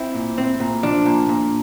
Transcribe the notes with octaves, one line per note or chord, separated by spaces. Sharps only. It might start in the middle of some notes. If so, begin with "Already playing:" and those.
Already playing: C4 E4
A#2
C4
A#2
F3 D4
A#2
A#2